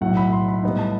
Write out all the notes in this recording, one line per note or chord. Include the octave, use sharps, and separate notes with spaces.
B1 A2 F#3 F#5
B5
C6
B5
A2 G3 B3 D#4
A5